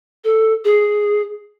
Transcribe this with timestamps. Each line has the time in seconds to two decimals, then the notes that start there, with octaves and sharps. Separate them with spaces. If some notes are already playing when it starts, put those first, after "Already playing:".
0.24 A4
0.65 G#4